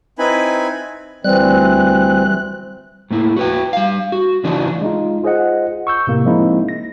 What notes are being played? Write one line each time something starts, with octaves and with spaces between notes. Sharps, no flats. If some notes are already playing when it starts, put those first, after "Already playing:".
C4 D#4 E4 B4 G#5 B5
D2 E3 G3 C4 F#6
A2 A#3 E4
F#4 B4 G5
G3 F5
F#4
C#3 E3 D4 D#4 F4 F#4
G#3 D#4 F4
F4 G#4 C5 D#5 F#5
C#6 E6 G6
A2 C3 A#3
F3 G#3 A#3 C4 D#4 E4
A#6